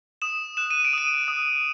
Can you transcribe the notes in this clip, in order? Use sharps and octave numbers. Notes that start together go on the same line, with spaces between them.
D#6 E7
F#6 E7
D#7
D7
D#6 D#7
D#6